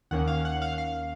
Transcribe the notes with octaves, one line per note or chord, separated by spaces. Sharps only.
D#2 D#3 A#3 C#4 F#5
F5
F#5
F5
F5